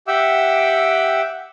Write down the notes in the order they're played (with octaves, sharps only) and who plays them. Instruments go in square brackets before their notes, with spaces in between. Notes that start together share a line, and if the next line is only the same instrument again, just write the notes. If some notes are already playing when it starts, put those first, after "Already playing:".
[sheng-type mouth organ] G4 E5 F#5 G5 D6 E6